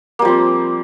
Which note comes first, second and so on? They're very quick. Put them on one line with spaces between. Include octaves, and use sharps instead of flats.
A#3 G3 F3 C4